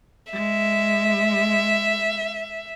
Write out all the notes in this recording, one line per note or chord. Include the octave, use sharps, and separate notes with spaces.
G#3 E5